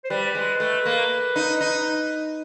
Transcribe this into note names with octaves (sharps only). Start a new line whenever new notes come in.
C5
G3 B4
G#3
A3
A#3
D#4
D#4